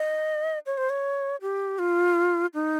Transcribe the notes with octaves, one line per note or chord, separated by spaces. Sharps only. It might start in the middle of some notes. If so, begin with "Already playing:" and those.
Already playing: D#5
C#5
C5
C#5
G4
F4
D#4